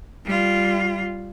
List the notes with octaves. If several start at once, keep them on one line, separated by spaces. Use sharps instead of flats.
G3 F4